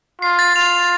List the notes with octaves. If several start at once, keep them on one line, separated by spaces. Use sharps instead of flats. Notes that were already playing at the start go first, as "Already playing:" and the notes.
F4 C7
A6
F4 F7
F7